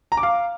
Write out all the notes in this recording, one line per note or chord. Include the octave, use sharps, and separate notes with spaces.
A#5
D6
F5